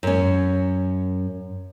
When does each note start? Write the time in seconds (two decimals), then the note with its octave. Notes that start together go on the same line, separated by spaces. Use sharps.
0.03 F#2 C#4